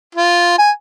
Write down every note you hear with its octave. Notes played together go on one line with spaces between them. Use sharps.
F4
G#5